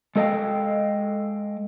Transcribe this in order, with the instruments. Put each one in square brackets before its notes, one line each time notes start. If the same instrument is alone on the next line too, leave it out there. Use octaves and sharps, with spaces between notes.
[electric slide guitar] G#3 A4 D#5 F5 G5